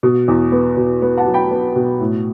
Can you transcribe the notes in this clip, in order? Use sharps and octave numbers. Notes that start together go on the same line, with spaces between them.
B2
E2
B3
B2
B3
F#5 A5
F#3
G5 B5
B3
B2
A2